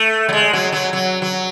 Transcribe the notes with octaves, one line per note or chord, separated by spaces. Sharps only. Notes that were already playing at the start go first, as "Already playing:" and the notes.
Already playing: A3
F#3
G#3
F#3
F#3
F#3
F#3